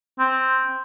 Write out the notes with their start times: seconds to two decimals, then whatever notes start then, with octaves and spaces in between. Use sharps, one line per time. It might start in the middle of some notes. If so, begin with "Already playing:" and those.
0.19 C4